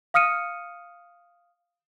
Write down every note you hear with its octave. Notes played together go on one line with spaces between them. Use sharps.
F5 D#6 F6 C#7 D#7